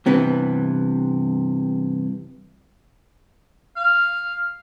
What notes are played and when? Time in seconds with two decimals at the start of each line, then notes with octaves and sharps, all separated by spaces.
0.06 G2 C3 E3 B3
3.76 F5